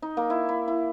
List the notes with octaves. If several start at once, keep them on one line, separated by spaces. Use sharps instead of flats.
D#4
A#3
E4
E4
E4